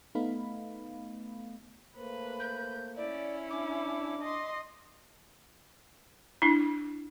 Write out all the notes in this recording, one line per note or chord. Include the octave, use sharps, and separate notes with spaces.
A3 B3 D#4 F5 B5
A3 A#3 B4 C5
G6
C#4 E4 D5
D4 D6
D#5 C6
D4 E4